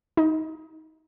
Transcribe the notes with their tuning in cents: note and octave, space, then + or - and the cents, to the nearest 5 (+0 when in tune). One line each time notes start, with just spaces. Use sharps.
D#4 +25